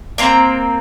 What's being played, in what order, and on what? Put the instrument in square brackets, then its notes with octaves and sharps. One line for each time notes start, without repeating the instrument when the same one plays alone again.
[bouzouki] A#3 C4 A#5